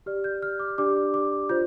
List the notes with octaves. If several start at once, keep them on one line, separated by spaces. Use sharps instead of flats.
G4 D5 F6
G6
F6
D6
D4 G4 D5 D6
D6
F4 C5 G6